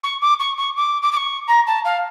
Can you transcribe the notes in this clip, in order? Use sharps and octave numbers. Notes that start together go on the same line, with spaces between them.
C#6
D6
C#6
C#6
D6
D6
D6
C#6
A#5
A5
F5